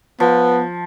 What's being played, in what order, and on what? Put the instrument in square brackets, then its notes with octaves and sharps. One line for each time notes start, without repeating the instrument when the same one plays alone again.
[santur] F3 [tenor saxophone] B3